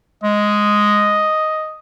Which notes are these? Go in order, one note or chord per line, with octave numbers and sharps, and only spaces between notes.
G#3 D#5